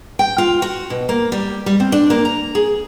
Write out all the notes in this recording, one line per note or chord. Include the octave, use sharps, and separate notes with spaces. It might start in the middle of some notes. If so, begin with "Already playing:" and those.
G5
F4
F#4
B2
A#3
G3
G3
C4
D4
A#3
A#5
G#4